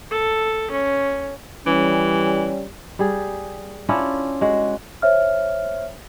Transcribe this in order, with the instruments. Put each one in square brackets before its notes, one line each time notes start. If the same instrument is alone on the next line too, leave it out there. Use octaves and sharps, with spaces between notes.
[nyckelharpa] A4
C#4
[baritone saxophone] E3 [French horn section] G3 C#4
[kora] G3 G#4
C#4 D4 E4 F4
G#3 F#4
[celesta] C5 C#5 E5 F6